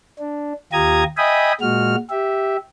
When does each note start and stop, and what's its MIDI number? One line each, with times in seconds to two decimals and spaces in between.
0.19 0.53 62
0.72 1.03 39
0.72 1.03 65
0.72 1.03 67
0.72 1.03 82
0.72 1.03 87
0.72 1.03 92
1.17 1.52 75
1.17 1.52 76
1.17 1.52 79
1.17 1.52 80
1.17 1.52 83
1.17 1.52 87
1.61 1.95 46
1.61 1.95 56
1.61 1.95 66
1.61 1.95 89
2.10 2.57 67
2.10 2.57 76